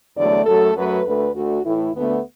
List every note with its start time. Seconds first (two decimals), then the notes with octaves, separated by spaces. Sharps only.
0.17 E2 D3 F#3 A3 D5
0.46 F#2 F#3 A3 A4
0.75 F#2 F#3 A3 B4
1.05 D2 D3 A3 B4
1.34 D2 D3 A3 F#4
1.64 A2 E3 A3 E4
1.94 D2 D3 A3 B3